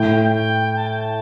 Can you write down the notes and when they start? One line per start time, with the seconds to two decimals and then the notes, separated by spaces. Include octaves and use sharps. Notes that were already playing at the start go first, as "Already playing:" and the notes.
Already playing: A2 G5
0.33 G5
0.75 A5
0.86 G5
0.98 A5